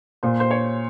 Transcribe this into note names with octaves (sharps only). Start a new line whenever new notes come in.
A#2 C5
C5
C#5